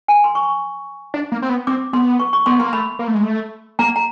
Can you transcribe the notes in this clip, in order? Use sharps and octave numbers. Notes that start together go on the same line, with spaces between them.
G#5
C6
C#6
D4
A#3
C4
B3
C4 D6
B3 C6
C#6
C#6
B3 C6
A#3 C6
A3 B5
A#3
A3
G#3
A3
A#3 A#5
A#5